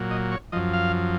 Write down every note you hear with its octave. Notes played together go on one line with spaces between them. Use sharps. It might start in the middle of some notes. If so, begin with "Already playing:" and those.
Already playing: A#2 F#3
D#5
C#5
F#2 F3 D#5
F5